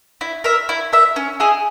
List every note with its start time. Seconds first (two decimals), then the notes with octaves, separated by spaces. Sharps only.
0.21 E4
0.44 A#4 E5
0.69 E4
0.93 A#4 E5
1.16 C#4
1.40 E4 G#4 D#5